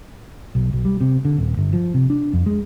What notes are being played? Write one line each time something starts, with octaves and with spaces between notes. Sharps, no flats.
B1
B1
G3
C3
D3
D#1
G1
F3
C3
D4
F2
G#3